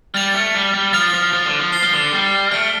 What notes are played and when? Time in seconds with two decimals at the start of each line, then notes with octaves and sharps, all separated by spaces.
0.14 G3 F6 A6 F7
0.34 A3
0.55 G3
0.74 G3
0.93 F3 F6 A6 F7
1.14 F3
1.33 F3
1.46 D3
1.59 F3
1.72 F6 C7 G7
1.83 F3
1.93 D3
2.12 G3
2.51 A3 F6 D7 G7